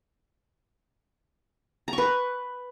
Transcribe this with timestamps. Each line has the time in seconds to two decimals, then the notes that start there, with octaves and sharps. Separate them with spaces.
1.88 A#5
1.93 C#6
1.98 B4